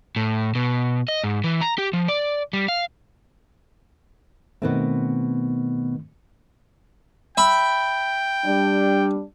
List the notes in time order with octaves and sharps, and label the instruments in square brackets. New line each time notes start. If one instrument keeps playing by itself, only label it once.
[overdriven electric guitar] A2
B2
D#5
G#2
E3
A#5
G4
F3
D5
G3
F5
[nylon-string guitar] B2 B3 C4 [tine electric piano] D#3 A3
[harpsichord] E5 B5 [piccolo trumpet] G5
[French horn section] G3 D4